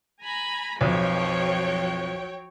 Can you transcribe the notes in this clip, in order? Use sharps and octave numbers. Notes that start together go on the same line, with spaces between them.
G#5 A#5 B5
B1 F2 F3 F#3 C#5 G5